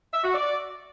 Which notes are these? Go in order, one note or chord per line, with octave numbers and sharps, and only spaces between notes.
E5
F#4
D5